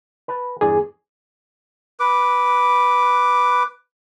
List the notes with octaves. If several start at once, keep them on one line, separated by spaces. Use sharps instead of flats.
B4 A5
E2 G2 G#4 D5
B4 D6